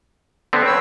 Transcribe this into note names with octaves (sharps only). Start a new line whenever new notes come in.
D3 B3 C4
C4 B4 C#5 E6